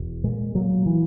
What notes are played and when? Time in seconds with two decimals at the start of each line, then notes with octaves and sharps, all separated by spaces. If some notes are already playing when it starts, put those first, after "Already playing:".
Already playing: E1
0.24 A#2 G#3
0.55 A#2 F#3
0.86 E3